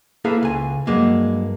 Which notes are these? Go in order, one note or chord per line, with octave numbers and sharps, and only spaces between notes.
A#3 E4 G#4 A4 B4 F5
C#2 G#5
G2 F#3 G#3 A#3